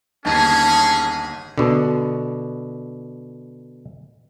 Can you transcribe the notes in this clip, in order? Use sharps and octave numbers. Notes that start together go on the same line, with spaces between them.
G1 D#2 C#4 D#4 G#4 A5
B2 D3